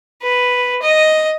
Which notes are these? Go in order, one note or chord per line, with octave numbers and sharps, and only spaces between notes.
B4
D#5